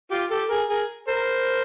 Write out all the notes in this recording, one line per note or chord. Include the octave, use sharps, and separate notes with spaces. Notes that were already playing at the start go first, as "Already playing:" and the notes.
F4 G4
G4 A4
G#4 A#4
G#4 A#4
A#4 C5